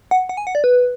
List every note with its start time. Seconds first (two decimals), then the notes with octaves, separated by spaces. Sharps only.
0.11 F#5
0.29 F#5
0.37 G#5
0.47 F#5
0.55 D5
0.64 B4